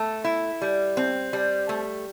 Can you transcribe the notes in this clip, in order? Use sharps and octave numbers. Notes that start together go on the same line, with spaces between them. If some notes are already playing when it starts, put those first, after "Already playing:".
Already playing: A3
E4
G3
C4
G3
A3